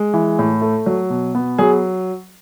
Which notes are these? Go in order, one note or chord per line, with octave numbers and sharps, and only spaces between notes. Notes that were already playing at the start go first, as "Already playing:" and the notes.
Already playing: G#3
E3
A2
A3
F#3
B2
B3
F#3 G#4